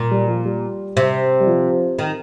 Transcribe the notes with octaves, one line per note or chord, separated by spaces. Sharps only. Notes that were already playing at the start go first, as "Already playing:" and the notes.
Already playing: A#2
G3
F3
G3
C3
G3
F3
D#3